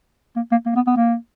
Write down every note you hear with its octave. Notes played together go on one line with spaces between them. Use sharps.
A#3
A#3
A#3
B3
B3
A#3